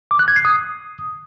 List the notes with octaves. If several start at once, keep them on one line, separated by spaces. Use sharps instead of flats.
D6
F#6
G#6
C7
D#6